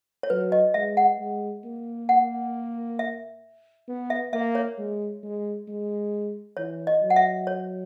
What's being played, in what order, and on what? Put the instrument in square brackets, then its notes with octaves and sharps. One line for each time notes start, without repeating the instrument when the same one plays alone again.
[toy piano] C#5
[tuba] F#3 [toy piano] B4
[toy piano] D#5
[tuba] G#3 [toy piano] E5
[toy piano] F#5
[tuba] G#3
A#3
[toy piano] F#5
E5
[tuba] B3
[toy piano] E5
[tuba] A#3 [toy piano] E5
[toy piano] C#5
[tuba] G#3
G#3
G#3
[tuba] E3 [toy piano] C#5
[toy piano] D#5
[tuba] F#3
[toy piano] F#5
E5
C#5